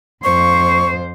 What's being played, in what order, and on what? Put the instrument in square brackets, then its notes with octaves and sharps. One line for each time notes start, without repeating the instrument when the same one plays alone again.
[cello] F2 C5 [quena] C#6